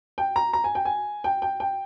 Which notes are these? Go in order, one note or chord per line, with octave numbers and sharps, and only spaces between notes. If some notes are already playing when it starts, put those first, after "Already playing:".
G5
A#5
A#5
G#5
G5
G#5
G5
G5
G5